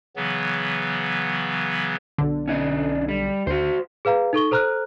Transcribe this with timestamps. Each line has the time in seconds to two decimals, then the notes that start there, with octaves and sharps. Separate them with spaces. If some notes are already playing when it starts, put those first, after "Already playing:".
0.16 C#3 E3 F#3 B3
2.18 B1 D3
2.48 C#4 D4 D#5
3.09 G3
3.47 D2 F#4 C5
4.05 G#4 B4 F5 A#5
4.33 D#4 A4 C#6 G7
4.51 A4 C5 A#5 F6 F#6